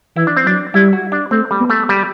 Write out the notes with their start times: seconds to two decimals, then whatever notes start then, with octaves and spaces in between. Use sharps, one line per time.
0.16 E3 E4
0.27 D4
0.37 C4
0.45 F#3 D4
0.74 G3 E4
0.93 F#4
1.12 D4
1.31 A3 C4
1.51 G3
1.61 B3
1.70 A3
1.89 G3